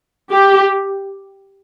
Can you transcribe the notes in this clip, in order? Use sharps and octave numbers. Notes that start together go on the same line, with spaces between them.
G4